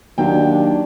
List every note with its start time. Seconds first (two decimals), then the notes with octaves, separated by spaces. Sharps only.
0.18 D#2 F#3 D4 G5